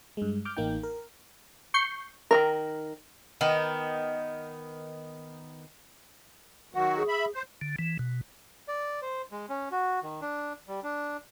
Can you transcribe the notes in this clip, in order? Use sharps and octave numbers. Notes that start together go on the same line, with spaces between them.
G2 G#3
D6 F6 G6
A1 A#3 D#4 G5
A#4
C#6 G6 C7
D#3 E3 A#4 A#5
D#3 B3
D#3 F#3 F#4 F#5
G#4
E5 B5
C5
D3
E3
B2
D5
C5
G#3
C#4
F#4
D#3
D4
G3
D4